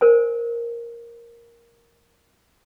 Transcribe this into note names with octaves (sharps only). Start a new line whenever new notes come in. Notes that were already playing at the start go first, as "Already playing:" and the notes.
A#4 C5 G#5